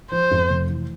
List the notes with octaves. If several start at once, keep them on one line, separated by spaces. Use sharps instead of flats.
F3 C5
F2
F1
E3